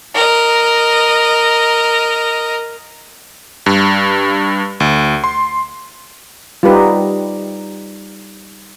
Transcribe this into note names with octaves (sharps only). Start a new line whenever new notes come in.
A#4 D#5
G2
D2
C6
G3 D#4 F4 G4 B4